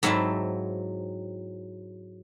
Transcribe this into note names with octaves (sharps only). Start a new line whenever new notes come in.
G#2 F#3 C4 E4 A5